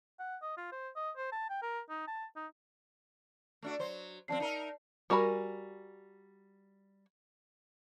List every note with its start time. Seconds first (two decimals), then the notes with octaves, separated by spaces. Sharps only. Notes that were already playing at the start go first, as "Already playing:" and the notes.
0.19 F#5
0.42 D#5
0.57 F4
0.72 C5
0.96 D#5
1.17 C5
1.32 A5
1.50 G5
1.62 A#4
1.89 D#4
2.08 A5
2.36 D#4
3.62 A3 D4 F#4
3.79 F#3 C5
4.28 C#3 F3 C4 D5 A5 C7
4.40 D#4 A#4 E5
5.10 G3 F#4 A#4 G#5 B5